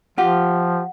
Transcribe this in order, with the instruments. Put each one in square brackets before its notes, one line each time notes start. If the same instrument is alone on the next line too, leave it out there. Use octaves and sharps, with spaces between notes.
[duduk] F3 [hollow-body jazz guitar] F4 G4 [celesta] F#5